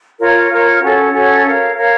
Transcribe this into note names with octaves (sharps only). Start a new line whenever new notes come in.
F4 A#4 C#5
F4 A#4 C#5
C#4 F#4 A4 C#5
C#4 F#4 A4 C#5
A#4 C#5 F5
A#4 C#5 F5